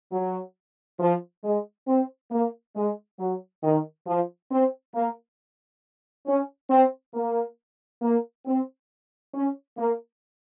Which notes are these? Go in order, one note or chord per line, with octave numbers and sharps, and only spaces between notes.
F#3
F3
G#3
C4
A#3
G#3
F#3
D#3
F3
C4
A#3
C#4
C4
A#3
A#3
C4
C#4
A#3